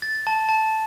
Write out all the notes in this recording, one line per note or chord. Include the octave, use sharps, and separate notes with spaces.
A6
A5
A5